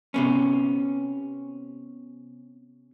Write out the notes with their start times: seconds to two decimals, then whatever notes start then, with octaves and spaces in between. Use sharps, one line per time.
0.14 C3 B3 C#4